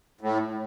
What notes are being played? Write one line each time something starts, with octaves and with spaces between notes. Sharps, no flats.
A2